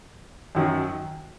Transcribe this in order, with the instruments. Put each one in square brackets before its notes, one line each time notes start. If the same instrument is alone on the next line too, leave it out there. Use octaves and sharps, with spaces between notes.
[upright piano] F#2 D#3 F#3